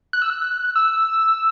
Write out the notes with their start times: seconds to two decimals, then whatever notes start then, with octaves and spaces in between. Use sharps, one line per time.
0.13 F#6
0.22 E6
0.30 F#6
0.75 E6